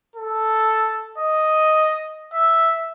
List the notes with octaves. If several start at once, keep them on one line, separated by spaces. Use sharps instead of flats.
A4
D#5
E5